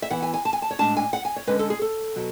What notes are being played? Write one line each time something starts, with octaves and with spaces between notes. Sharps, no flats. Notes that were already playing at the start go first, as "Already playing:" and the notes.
E5
E3 B3 E4 F#5
G#5
G#5
A5
G#5
A5
C#5
A2 G#3 D4 A5
G#5
F#5
G#5
C#5
D3 G#3 C#4 B4
A4
G#4
A4
B2 F#3